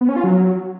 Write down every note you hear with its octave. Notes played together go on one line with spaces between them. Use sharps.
B3
C#4
F4
F#3